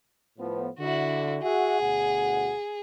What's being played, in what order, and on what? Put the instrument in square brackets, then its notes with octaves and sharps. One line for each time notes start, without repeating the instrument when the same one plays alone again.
[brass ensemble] A2 F3 B3
[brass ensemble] D3 [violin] E4 F#4
[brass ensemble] F#4 E5 F#5 [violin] G#4
[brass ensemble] D2 B2 F#5